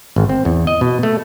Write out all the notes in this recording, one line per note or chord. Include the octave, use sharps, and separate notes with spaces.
G#1
C4
E2
D#5
B2
A3